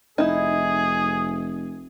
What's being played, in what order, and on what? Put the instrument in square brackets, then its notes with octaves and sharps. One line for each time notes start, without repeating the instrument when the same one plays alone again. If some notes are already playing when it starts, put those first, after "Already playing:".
[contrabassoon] F1 [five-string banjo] D#4 E4 [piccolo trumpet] G#4